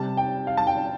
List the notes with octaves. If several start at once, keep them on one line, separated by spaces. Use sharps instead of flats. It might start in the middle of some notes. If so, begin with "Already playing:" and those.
Already playing: C3 G3 A5
G5
F5
A5
G5